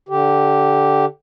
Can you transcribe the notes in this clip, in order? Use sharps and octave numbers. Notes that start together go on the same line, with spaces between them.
D3 G4